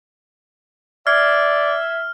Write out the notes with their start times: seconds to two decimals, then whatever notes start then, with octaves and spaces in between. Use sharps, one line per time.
1.07 D5 E5 F6 G#6 C7